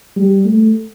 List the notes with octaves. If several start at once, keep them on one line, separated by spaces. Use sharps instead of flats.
G3
A3